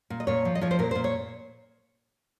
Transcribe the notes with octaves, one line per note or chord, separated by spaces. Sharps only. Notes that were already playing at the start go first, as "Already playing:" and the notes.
A#2
D#5
A#2 C#5
F3
D#5
F3 C#5
C5
A#2 A#4
C5
A#2
C#5